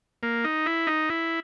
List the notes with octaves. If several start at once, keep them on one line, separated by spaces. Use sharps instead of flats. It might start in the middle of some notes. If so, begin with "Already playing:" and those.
A#3
D#4
E4
D#4
E4